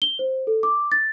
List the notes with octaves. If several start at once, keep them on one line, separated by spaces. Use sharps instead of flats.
G7
C5
A4
D6
A6